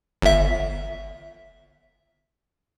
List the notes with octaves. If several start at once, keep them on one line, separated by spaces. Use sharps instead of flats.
G1 E5